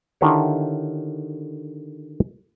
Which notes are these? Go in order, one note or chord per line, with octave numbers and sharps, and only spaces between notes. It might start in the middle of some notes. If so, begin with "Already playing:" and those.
D3 D#3 E4 G4 C#5